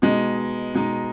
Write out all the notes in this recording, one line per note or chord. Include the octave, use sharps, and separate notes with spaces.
B2 G#3 D#4
B2 G#3 D#4